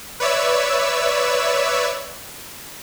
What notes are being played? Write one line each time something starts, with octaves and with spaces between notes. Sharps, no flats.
B4 C#5 D5 E5 E6